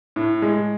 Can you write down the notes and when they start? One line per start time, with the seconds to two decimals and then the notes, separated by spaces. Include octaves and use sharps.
0.16 A2
0.42 G#3